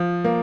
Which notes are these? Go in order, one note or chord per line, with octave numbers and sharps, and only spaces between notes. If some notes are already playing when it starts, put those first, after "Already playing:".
Already playing: F3
A#3